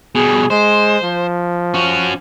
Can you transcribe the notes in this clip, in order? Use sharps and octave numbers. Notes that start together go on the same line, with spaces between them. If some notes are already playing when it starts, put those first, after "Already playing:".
B2 G3 G#4
G#3 C5
F3
C#4 F#4